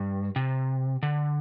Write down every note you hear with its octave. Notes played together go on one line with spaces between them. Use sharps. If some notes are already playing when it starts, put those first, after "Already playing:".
Already playing: G2
C3
D3